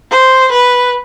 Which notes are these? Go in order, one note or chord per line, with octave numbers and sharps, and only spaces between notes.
C5
B4